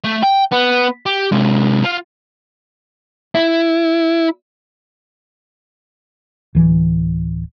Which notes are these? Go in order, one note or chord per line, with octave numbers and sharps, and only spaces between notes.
A3
G5
B3
G4
C3 G#3
F4
E4
D1 E3